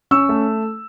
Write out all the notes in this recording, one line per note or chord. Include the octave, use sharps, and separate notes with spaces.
C#4 C#6 E6
A3